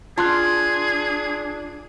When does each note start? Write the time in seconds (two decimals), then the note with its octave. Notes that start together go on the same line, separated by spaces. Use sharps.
0.18 D4 F4 G#4 A5 C6 F#6